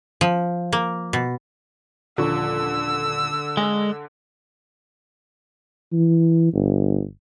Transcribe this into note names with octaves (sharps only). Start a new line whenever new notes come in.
F3
A#3
B2
D#1 D3 F3 C#6 E6
G#3 G#5 A#6
E3
G1